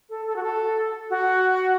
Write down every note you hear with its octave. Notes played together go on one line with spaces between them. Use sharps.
A4
A4
F#4
A4
F#4